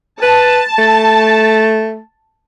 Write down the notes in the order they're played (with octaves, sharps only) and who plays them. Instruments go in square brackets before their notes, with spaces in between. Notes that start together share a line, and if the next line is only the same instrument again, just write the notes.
[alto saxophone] B4 [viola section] A5
[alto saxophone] A3